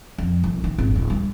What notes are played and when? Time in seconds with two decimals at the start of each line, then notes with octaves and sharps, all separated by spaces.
0.18 F2
0.44 C2
0.64 D#3
0.78 G#1
0.95 D1
1.10 G3